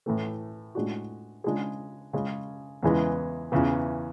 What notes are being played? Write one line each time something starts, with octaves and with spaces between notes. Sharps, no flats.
A2 E3 A3
A2 G#3 D4 F#4
C#3 G#3 D4 G#4
C#3 G#3 C#4
E2 C#3 E3 G#3 B3
E2 C#3 E3